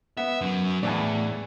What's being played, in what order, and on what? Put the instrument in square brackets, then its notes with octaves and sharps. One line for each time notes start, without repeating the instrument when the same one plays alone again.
[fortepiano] B3 [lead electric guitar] E5
[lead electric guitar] F#2 F#3
[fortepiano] E2 E3 D4 [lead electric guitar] A2